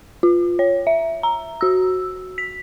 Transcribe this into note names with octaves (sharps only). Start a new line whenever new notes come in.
F4
C#5
E5
A#5
F#4 E6
B6